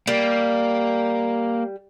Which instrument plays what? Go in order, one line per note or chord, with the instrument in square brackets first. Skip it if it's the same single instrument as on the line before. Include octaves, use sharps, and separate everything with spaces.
[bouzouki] G3 [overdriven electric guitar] A#3